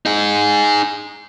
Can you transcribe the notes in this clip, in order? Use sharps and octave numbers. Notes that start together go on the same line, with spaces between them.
D#4 G#4